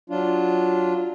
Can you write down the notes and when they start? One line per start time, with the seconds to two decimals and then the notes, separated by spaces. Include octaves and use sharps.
0.10 F#3 D4 F4